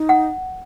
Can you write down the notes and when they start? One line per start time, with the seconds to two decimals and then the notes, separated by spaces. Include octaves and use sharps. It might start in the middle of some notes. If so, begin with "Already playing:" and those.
Already playing: D#4
0.09 F#5